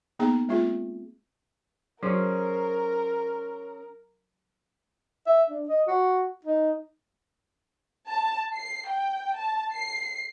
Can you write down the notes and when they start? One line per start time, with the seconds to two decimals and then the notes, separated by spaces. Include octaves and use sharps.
0.19 A#3 B3 D#4 G#4 A#5
0.49 G#3 A#3 C4 F4 G#4
2.03 F#3 C#4 F#4 G#4 A#4 C5
5.27 E5
5.50 D4
5.69 D#5
5.87 F#4
6.45 D#4
8.09 A5
8.54 C7
8.88 G5
9.37 A5
9.73 C7